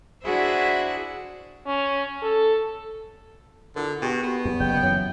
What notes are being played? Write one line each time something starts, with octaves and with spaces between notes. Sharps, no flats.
D4 E4 F#4 G#4 C5 E5
C#4
A4
D3 E4 F4 A#4
B2 G4 G#4 G5
B3 F#4 G4
E2 G#4
F#1 G5
F#2 E3 C#5